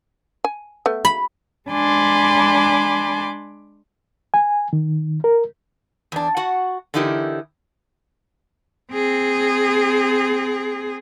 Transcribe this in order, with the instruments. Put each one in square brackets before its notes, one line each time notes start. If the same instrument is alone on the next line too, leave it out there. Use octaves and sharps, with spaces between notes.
[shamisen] G#5
A3 B3
[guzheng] B5
[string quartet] G#3 D4 G#5 B5 C6 D6
[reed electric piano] G#5
D#3
A#4
[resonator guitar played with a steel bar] E2 D4
F#4 F#5
D3 E3 D#4 E4 G4 A#4
[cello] C4 G#4